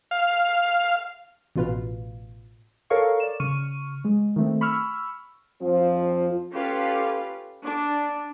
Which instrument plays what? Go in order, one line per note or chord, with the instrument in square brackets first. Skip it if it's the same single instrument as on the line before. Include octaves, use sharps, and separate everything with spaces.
[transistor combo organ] F5
[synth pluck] A1 B2 F4 B4 F5
[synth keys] A4 A#4 C#5 F5 C#6
D5 E7
C#3 C#6 F6 D#7
G#3
D#3 A3 C4
B5 C#6 E6 F6
[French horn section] F2 F3 C4 F4
[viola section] C#4 F4 G4 A4 B4 F5
D4